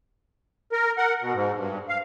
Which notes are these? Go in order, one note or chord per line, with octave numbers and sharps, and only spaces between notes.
A#4
A#4 F#5
B2
G#2
G2
F5